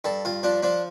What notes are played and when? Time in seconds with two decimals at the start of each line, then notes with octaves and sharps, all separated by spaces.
0.04 G2 A4
0.25 G2 F4
0.43 F3 D4
0.63 F3 D4